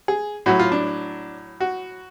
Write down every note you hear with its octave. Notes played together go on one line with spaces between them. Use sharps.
G#4
A2 F#3 F#4
F4
D4
F#4